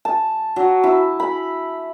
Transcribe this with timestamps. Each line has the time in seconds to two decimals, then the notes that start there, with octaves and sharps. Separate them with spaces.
0.05 A5
0.56 F#3
0.84 E4
1.20 B5